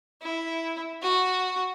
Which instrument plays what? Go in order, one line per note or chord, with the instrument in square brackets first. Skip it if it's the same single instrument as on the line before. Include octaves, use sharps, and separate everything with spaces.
[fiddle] E4
F#4